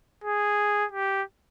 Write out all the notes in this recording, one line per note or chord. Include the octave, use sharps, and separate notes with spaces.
G#4
G4